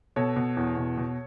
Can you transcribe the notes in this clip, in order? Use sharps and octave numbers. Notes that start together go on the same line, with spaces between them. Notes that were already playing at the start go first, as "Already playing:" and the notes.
B2 A4 C#5
B2
E2
B2
B2